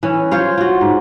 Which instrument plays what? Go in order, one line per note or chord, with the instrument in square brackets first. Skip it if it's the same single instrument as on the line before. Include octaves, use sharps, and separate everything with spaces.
[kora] E3 C#4
F4 C5 C#5 F5
F4 F#4
G#2